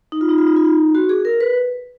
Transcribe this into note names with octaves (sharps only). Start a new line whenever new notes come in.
D#4
F4
D#4
F4
D#4
F4
D#4
F#4
G#4
A#4
B4